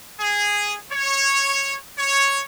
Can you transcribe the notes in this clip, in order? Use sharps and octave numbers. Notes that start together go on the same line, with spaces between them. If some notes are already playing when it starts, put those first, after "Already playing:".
G#4
C#5
C#5